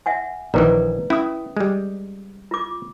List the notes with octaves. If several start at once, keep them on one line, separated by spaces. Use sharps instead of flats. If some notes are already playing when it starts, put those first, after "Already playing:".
E5 F#5 G#5
A#1 D#3 E3 B4 D5 A#5
C#4 E4 D#6
G3 G#3
F4 D6